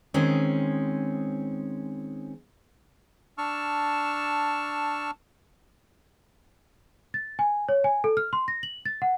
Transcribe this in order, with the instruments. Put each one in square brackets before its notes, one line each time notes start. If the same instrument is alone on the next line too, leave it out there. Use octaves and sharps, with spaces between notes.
[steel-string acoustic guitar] D#3 G#3 C4 C#4
[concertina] D4 A5 C#6 E6 F6
[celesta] A6
G#5
C#5
G#5
A4
F6
C6
A#6
F#7
A6
F#5